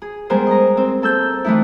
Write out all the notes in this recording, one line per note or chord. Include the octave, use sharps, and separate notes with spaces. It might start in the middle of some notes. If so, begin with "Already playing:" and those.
G#4
G3 G#3 B3 G#4 A#4 C5
D#5 A#5
C4
A#3 A4 E6 G6
E3 G3 A3 D#4 E4